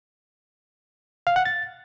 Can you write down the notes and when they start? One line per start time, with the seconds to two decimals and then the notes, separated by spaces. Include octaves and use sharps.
1.27 F5
1.36 F#5
1.45 A6